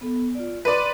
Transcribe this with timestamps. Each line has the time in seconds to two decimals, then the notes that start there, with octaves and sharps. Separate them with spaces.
0.01 B3 A4
0.35 F4 D5
0.65 B4 D5 C6